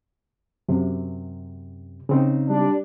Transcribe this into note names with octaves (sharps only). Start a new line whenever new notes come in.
F#2 C3
C#3 C4 D#4
G3 D4